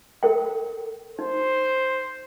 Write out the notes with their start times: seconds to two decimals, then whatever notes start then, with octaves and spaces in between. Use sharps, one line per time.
0.23 A4 A#4 G5
1.19 D#4 C5